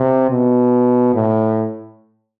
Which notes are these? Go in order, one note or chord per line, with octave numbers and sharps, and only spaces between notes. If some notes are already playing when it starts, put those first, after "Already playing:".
Already playing: C3
B2
A2